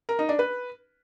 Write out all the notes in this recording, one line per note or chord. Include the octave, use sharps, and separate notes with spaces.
A#4
D#4
D4
B4